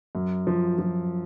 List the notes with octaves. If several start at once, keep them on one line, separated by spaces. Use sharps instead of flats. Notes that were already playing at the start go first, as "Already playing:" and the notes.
F#2
F3
F3